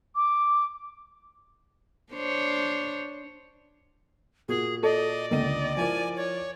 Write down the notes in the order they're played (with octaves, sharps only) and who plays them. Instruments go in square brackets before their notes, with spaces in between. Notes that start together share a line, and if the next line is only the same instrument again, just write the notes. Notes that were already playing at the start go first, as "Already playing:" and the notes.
[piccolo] D6
[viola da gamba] D4 C5 C#5
[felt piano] A#2 F#4 A#4 [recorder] G#4
[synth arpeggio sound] A4 [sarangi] D5 [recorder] D#5
[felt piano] C#2 D3 D#7 [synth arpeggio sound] A#3 [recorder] D#5
[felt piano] F3 E4 A#4 [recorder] G#5
[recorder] C#5